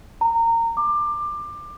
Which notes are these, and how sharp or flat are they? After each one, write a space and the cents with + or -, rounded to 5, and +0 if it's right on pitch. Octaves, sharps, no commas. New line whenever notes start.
A#5 -25
D6 +20